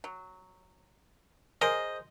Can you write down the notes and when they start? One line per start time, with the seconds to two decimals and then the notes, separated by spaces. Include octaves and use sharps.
0.04 F#3
1.61 G#4 A#4 C5 D#5